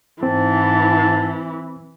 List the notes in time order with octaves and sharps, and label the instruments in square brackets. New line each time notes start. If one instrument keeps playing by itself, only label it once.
[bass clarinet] G#2 [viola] E3 [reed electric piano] C4 [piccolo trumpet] A5